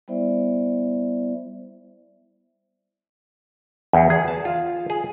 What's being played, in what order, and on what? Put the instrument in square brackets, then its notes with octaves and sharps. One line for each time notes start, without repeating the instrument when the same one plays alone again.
[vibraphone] G3 B3 E4 C5 D5 E5
[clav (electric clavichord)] E2
G#4
A5
F4
G#4